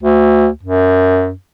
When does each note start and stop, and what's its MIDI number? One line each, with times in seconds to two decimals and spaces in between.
0.03 0.48 38
0.63 1.33 42